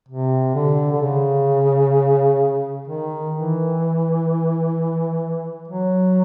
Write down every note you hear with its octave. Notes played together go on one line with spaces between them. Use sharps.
C3
D3
D3
C#3
D#3
E3
F#3